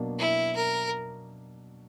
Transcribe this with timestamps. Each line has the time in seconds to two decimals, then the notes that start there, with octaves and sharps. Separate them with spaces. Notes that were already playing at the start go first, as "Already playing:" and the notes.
Already playing: B2 F#3 A#3 D4
0.19 E4
0.56 A#4